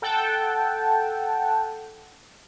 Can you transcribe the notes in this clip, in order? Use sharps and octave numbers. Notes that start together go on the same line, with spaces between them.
A4 F#5 G5 A5